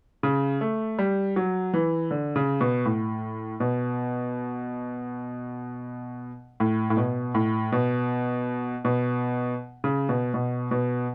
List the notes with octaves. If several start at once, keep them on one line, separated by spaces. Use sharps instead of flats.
C#3
A3
G3
F#3
E3
D3
C#3
B2
A2
B2
A2
A2
B2
A2
B2
B2
C#3
B2
B2
B2